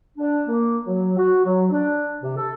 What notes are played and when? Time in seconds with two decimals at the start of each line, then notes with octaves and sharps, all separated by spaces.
0.17 D4
0.47 A#3
0.86 F#3
1.17 F#4
1.45 F#3
1.71 D4
2.23 C3
2.36 A4